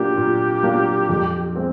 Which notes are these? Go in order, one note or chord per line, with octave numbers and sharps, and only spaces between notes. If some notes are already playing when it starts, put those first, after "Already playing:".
Already playing: A#2 F#3 A#3 D4 F4 G4
A#2
F#3 A#3 D4 F4
F2
G#3 C4